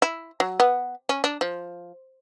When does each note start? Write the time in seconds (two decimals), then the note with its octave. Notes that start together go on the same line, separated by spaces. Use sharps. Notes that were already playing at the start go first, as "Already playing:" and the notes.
0.02 E4
0.40 F#3
0.60 B3
1.09 C#4
1.24 D4
1.41 F3